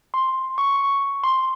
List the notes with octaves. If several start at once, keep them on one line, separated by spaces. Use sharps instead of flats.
C6
C#6
C6